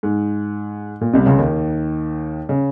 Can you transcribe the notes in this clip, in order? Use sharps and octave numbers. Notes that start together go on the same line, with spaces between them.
G#2
A#2
C2 C3
C#2 C#3
D#2 D#3
C#3